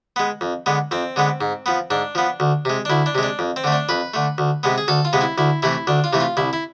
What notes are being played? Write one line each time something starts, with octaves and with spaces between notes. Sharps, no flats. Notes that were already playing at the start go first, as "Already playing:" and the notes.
G#3 B3
F2
D3 G#3 B3
F2 C4
D3 G#3 B3
G#2
F3 B3
G#2 D4
F3 B3
D2
C3 G#3
D4
D2 E4
D4
C3 G#3
D4
F2
C4
D3 A3
D4
F2 B4
D3 A3
D2
C3 G#3 B3
G#4
D2 A4
F4
C3 G#3 B3
E4
D2 E4
C3 E3 A3 E4
D2 D4
F4
C3 E3 A3
F4
C2 E4
E4